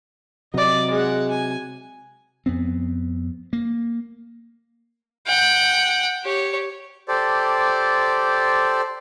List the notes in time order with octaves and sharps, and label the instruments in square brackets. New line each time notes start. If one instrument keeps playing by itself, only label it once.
[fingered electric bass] C3 F#3 [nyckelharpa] D5 D#5
[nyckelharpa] G#3 F#5
G#5
[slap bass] F2 B3 C4
A#3
[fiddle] F#5 G5
G4 C#5
[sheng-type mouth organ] G4 A4 C5 D5